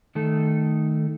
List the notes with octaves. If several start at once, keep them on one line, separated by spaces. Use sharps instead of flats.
D#3 A3 A4